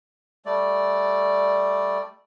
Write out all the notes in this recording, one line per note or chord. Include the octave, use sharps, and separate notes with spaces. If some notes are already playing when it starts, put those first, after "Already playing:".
G3 A3 D5